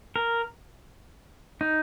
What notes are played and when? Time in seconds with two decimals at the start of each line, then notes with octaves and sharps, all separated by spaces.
0.16 A#4
1.61 D#4